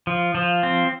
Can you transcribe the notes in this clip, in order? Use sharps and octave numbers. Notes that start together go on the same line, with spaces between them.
F3
F3
C4